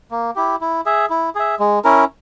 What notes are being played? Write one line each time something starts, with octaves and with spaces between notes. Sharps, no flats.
A#3
E4 G4
E4
G#4 E5
E4
G#4 E5
G#3
C#4 E4 A#4